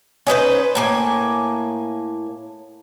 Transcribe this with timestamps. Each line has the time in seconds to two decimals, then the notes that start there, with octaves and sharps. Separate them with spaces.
0.27 C#4 D#4 B4 C5
0.75 A2 A#3 G#5